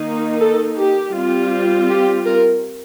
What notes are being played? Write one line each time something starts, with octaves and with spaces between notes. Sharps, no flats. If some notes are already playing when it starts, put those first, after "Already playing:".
Already playing: D#3 A#3 D#4
A4
G4
G3 C4 F4
G4
A#4